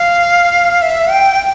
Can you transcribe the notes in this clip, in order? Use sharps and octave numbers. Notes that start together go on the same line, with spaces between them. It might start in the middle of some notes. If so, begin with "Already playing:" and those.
Already playing: F5
E5
G5